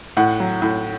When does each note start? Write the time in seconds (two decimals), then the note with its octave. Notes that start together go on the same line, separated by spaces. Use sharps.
0.17 A2 F#5
0.40 F#3
0.62 A2